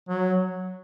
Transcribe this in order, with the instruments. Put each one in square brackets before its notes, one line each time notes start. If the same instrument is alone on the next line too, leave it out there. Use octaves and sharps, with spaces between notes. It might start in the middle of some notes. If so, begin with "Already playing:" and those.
[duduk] F#3